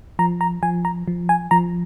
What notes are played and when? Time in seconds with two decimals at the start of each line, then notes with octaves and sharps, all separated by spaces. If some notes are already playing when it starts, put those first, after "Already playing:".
0.19 F3 A#5
0.41 A#5
0.63 F3 G#5
0.85 A#5
1.08 F3
1.29 G#5
1.51 F3 A#5